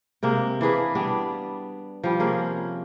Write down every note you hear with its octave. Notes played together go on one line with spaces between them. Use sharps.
C3 G#3 A#3
E3 D4 G#4 B4
G3 B3 D4
F3 G3
C3 A#3 C#4 G#4